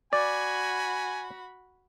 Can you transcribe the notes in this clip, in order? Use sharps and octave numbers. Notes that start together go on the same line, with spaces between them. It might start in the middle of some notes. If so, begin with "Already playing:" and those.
F#4 D5 G#5 B5